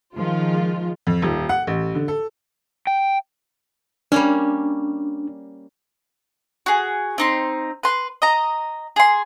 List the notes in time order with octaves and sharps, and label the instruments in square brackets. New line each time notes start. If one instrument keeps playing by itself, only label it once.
[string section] D#3 F3 G#3 F4
[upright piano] F2
D#1
F#5
A1
D3
A4
[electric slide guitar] G5
[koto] G3 A#3 C#4 [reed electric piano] D4
[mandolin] F#4 G#4
C4 D#4 C6
B4 C6
D#5 A#5
G#4 C6